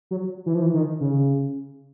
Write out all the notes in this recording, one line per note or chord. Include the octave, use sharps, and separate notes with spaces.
F#3
E3
F3
E3
D#3
C#3